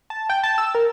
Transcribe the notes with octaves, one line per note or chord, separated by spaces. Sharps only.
A5
G5
A5
E6
A#4